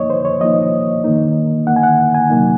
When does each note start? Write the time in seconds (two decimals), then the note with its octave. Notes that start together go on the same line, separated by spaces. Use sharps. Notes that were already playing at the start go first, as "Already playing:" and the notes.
Already playing: F3 A#3 D#4 C#5 D#5
0.10 C5
0.25 C#5
0.41 F3 A#3 D#4 D#5
1.04 D#3 A#3 D#4
1.67 D#3 A#3 D#4 F#5
1.76 G#5
1.83 F#5
2.15 G#5
2.30 C3 F#3 A#3 D#4